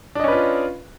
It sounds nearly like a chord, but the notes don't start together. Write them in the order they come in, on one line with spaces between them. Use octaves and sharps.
D4 D#5 C#4 B4 F4